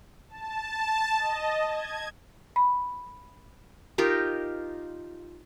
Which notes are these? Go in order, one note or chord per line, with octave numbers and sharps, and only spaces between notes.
A5
D#5
G#6
B5
D#4 F4 G4 A#4